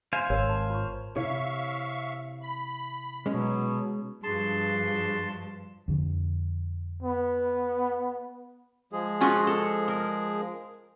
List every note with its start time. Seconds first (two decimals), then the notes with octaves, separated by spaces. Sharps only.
0.13 C5 E5 F5 G#5
0.30 G#1 A#4 C#5
0.50 A5
0.70 F4 C#6
1.17 C3 E4 C#5 E5 F5 C#6
2.42 B5
3.26 B2 F#3 G#3 C#4
4.23 G2 F3 D4 F#4 G#4 A5 C6
5.88 F2 D3
7.03 B3
8.92 F3 G#3 G#4
9.21 C#4 F4 F#4
9.47 A4
9.88 A#4